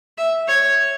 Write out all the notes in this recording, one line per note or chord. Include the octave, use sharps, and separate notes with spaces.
E5
C#5